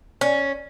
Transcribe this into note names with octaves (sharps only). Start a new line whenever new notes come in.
C#4